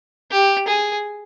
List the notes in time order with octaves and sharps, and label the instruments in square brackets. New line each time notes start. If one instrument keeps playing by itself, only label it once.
[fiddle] G4
G#4